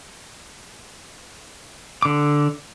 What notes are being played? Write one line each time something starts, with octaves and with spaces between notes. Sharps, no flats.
D3 D6